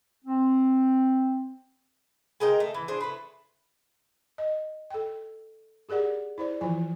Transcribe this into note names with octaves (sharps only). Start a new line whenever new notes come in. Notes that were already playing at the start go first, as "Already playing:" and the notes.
C4
G#3 A#4 D#5 G5
A3
E3
D4 G#4 C5
A3 B4
D#5
A4 G5
G4 G#4 A#4 D5 F#5
E4 C5 D5
E3 F3 E4 F4 G#5